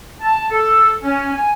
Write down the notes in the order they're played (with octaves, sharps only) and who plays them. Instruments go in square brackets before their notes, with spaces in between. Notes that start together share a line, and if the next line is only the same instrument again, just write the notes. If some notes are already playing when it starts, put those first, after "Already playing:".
[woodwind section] A5
A4
C#4
G#5